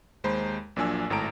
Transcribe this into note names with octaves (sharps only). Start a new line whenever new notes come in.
D#2 G#3 C5 A#5 B5
A#1 A#2 F#3 D4 G#5 E6
G#1 A2 A5 A#5 D7